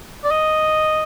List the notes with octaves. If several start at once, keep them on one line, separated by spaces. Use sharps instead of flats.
D5
D#5